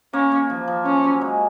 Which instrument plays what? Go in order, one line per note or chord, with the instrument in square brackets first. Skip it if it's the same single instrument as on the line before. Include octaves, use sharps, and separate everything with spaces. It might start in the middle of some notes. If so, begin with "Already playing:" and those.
[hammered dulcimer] A#3 [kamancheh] C#4
[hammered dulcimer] A#3
F3
F3
[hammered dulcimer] F3 [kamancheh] C#4
[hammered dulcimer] F#3
G#3